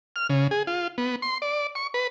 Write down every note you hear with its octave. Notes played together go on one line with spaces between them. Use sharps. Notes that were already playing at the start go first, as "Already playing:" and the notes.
F6
C#3
G#4
F4
B3
C6
D5
C#6
B4